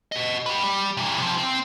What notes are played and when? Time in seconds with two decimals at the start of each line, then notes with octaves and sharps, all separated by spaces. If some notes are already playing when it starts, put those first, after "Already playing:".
0.12 F#4 D#5
0.46 G4 B4
0.64 G3
0.97 C3 E3
1.18 C3 F3
1.38 C4